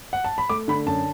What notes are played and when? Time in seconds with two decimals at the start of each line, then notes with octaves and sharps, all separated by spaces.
0.13 F#5
0.24 A5
0.38 B5
0.50 A3 D6
0.68 D3 B5
0.86 F#2 A5